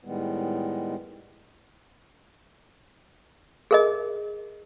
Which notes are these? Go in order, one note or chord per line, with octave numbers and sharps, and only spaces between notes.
A2 D#3 G3 G#3 B3
G#4 A#4 D#5